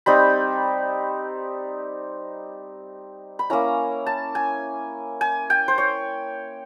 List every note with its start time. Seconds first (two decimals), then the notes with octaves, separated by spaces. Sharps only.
0.06 G3 C4 D#4 B5
3.39 B5
3.50 A#3 C#4 E4 A#5
4.06 A5
4.35 G#5
5.21 G#5
5.50 G5
5.68 C5
5.78 C#5